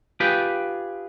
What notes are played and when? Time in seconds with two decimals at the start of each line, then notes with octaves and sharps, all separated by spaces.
0.20 F4 G4 G#4 B4 G5